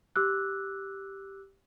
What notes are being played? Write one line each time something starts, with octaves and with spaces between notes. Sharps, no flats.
G4 D6 E6 F#6